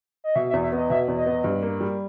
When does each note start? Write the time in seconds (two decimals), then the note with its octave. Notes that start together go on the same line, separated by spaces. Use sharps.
0.24 D#5
0.36 B2 E5
0.50 E5
0.53 E2
0.63 E5
0.72 B3 D#5
0.90 B2 E5
1.08 E2
1.18 D#5
1.26 B3
1.44 G2
1.63 A#3
1.80 G3